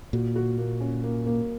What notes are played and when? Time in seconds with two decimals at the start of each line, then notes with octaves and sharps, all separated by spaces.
0.13 A#2 F#4
0.36 F#4
0.58 A#3
0.80 C#4
1.04 A#3
1.26 A#3